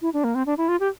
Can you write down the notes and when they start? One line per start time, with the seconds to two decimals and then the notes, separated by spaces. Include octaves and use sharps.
0.02 E4
0.13 D4
0.24 A#3
0.35 C4
0.46 D4
0.58 E4
0.68 F4
0.80 G4